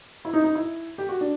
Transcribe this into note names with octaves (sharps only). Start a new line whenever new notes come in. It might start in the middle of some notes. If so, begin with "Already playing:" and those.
E4
D#4
D#4
E4
G4
F#4
D4